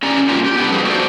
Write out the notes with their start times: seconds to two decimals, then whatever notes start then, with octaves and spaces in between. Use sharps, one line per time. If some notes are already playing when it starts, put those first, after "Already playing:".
0.03 C#4 G4 D5 A#5
0.28 F#3 G3 A#3 C#4 F4 G4
0.46 G4
0.57 B3 G4 A4 B4
0.71 F2 G3 G#4 B4 C5 F5
0.85 F#4 A4 C5 D5